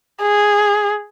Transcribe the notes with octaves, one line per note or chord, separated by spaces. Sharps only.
G#4